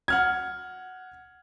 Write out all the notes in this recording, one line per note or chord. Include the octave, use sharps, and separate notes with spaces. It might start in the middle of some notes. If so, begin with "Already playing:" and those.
F#5 F6 G#6